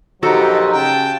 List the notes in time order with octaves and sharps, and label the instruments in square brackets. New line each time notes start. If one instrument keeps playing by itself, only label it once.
[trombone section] A#1 F#3 C5 [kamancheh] D#4 [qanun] F#4 A4 [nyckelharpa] G4
[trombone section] C#3 [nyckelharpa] G5 A5